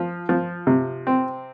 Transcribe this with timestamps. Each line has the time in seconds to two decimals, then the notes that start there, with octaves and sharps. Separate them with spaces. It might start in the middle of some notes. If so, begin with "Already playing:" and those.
Already playing: F3
0.29 F3
0.67 C3
1.07 C4